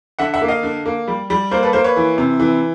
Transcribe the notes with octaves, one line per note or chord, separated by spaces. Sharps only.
D3 E5 F#5
E5 F#5
A#3
D#5 F5
D3
A#3
G3
G3
A#3 A#4 C5
A4 B4
A#3 A#4 C5
B4 C#5
E3
C3
E3